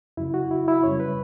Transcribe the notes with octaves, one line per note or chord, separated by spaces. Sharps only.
F#2 C#3 F#3 E4
F#4
E4
E4
F#2 C#3 G3 C#5
B4